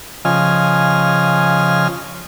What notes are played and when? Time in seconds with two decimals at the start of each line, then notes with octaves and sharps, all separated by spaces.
0.25 C#3 F3 D#5 G#5 F6